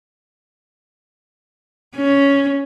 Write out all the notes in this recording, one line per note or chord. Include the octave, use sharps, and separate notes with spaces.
C#4